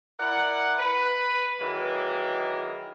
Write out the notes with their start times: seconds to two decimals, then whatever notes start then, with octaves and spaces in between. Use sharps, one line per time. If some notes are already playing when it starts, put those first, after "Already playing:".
0.20 E4 A#4 D5 F#5
0.79 B4
1.61 D#3 E3 F#3 G#3 A#3